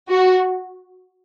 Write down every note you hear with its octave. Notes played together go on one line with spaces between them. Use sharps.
F#4